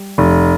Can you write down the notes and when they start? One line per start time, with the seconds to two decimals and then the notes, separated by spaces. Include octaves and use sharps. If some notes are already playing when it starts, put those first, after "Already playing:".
Already playing: G3
0.18 F1